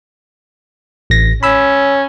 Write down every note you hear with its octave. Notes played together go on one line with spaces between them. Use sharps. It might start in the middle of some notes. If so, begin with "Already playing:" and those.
A1 A#6
C#4 B5 E6